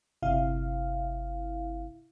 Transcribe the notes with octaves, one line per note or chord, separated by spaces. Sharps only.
G1 C3 E4 F5